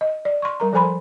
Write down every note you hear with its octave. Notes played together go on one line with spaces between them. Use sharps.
D#5
D5
C6 C#6
G3 A#4 A#5
F3 A4 C5 G#5 B5 C6